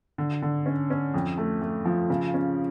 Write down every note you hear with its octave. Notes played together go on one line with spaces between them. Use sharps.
D3
D3
C#4
C#4
F2
A3
A3
F3
C#3
C#4